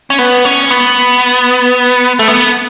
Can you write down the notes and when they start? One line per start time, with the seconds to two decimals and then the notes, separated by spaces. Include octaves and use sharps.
0.10 C#4
0.19 B3
0.45 C#4
0.70 B3
2.19 A3
2.28 B3